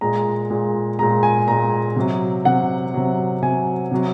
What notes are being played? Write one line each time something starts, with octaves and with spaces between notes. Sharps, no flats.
A#2 G#3 A#5
A#2 G#3
A#2 G#3 A#5
G#5
A#2 G#3 A#5
C3 F#3
C3 F#3 F#5
C3 F#3
C3 F#3 G#5
C3 F#3